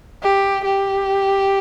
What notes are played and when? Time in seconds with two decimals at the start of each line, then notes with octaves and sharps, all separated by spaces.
0.23 G4
0.65 G4